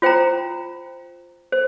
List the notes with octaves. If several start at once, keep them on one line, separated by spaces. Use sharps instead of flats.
F4 C5 G5 A#5
C5